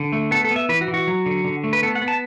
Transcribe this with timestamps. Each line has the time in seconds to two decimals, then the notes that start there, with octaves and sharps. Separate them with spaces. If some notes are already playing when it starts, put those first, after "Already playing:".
Already playing: D3
0.12 A3
0.31 B3 A4
0.45 A4
0.51 B3
0.56 E5
0.69 E3 B4
0.81 F#4
0.88 E3
0.94 F#4
1.07 F#3
1.26 D3
1.45 D3
1.64 A3
1.73 B4
1.83 B3 A4
1.95 F#5
2.02 B3
2.08 A5